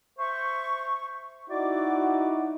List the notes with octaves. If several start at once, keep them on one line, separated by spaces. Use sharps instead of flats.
C5 E5 C#6
D#4 E4 F#4 D5 D6